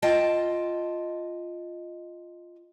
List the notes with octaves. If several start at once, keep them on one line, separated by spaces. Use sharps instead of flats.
F4 D#5 G5 A5